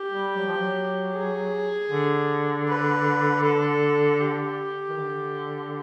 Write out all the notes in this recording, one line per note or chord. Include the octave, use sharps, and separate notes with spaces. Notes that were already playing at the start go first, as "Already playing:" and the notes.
Already playing: G4
G3
F#3
F3
F#3
G#4
D3
B4
A4
G4
D#3
D3